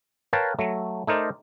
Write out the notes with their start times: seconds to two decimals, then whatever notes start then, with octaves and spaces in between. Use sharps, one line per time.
0.33 A#4 B4 C#5 F5 G5 A5
0.59 F#3 A3
1.07 A3 D#4 A#4 C5 D5